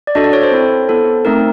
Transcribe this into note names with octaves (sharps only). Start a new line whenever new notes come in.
D5
D4 F#4 A4 D#5
D5
C#5
C5
C4 E4 A4
B3 E4 A4
A3 C4 D#4 A#4